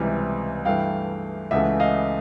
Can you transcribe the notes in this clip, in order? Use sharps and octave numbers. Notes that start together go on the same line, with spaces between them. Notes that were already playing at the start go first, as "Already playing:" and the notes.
Already playing: C#2 C3 E3 G3
G2 E3 A3 F5 G5
C#2 C#3 E3 A3 E5 F#5
D#5 F5